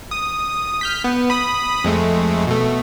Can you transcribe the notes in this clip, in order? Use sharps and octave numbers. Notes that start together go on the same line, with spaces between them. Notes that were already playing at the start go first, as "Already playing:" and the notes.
D#6
F6 G6 B6
B3
B5 D#6
F2 G#3 A3
B2 A3